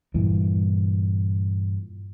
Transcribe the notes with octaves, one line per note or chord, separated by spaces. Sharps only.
G2 A#2 E3